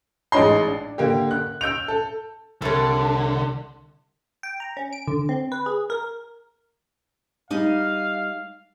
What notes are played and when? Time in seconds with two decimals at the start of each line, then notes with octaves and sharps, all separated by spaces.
0.32 A1 G#3 D#4 C#5 C6
0.67 D4
0.98 D3 A#3 G4
1.31 F#6
1.61 E6 G6 D7 F7
1.88 A4
2.62 C2 D3 A4 C#5
4.43 G5
4.60 A#5
4.77 C#4
4.93 D7
5.08 D3
5.29 C4
5.52 B4
5.66 G#4
5.90 A#4
7.50 G3 D#4 F5